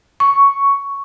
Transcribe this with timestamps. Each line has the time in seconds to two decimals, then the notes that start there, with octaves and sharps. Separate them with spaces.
0.20 C#6